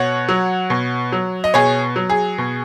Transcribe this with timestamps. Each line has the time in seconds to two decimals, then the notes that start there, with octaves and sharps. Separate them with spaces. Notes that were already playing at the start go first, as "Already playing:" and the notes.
Already playing: B2 C#5 F#5
0.29 F#3
0.70 B2
1.12 F#3
1.44 D#5
1.54 B2 G#4 C#5
1.96 F#3
2.10 G#4
2.38 B2